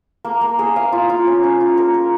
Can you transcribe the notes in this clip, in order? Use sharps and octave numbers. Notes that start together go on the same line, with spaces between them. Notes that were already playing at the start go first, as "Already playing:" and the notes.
A#3
A#3
G#4
F5
F4
F4
C#4
C#4
F4
A#4
A#4